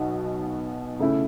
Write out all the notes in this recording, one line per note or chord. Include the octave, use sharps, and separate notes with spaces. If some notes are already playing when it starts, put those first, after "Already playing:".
Already playing: B1 B2 B3 F#4
C#3 A3 C#4 E4